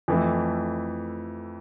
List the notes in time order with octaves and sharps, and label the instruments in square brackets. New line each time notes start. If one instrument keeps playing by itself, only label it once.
[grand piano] F2 E3 A3 E4